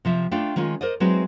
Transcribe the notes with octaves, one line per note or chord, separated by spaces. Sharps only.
C3 F3 E5
A3 D4 F4 D5 F5 G5
D#3 G#3 C#4 F4
A#4 C5 D5 D#5
F#3 G#3 C4 E4 F#4 B4